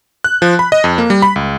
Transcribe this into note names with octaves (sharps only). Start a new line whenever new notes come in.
F#6
F3
B5
D#5
F2
A#3
G3
B5
C#2